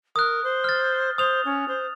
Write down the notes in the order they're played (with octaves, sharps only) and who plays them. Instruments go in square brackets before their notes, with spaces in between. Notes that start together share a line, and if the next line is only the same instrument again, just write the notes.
[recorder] A#4 [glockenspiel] D#6 F#6
[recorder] C5
[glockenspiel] F6 A6
[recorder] C5 [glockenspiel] D#6 F7
[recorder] C#4
C5